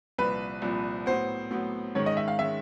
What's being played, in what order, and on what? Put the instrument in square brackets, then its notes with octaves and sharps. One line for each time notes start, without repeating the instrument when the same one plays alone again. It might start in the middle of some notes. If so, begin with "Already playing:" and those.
[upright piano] C2 A#2 F3 [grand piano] B4
[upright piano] C2 A#2 F3
[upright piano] A2 F#3 B3 [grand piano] C5
[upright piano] A2 F#3 B3
[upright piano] G#2 D#3 G#3 C#4 [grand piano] C#5
[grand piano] D#5
E5
F5
[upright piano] D#3 G#3 C#4 [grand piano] E5